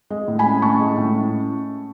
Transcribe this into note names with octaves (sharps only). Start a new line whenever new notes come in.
G#3
A2
G#5 B5
C#4
A2 A5 C#6
G#3
A2
C#4